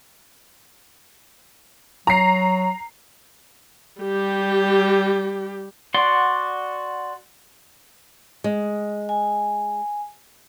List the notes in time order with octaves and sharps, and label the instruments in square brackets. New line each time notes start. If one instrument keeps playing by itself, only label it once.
[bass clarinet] F#3 [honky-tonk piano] A#5 C7
[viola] G3 G4
[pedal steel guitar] F#4 D5 F#5 C6
[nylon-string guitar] G#3
[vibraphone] G#5